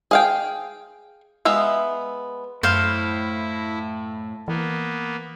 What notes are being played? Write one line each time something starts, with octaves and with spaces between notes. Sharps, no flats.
G#4 F5 G5
G#3 B3 E5 F5
F#2 A2 E4 C5 F5
E3 A#3 B3